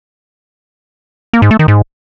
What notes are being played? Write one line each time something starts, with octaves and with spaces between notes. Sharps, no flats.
A#3
G#2
A3
D#3
G#2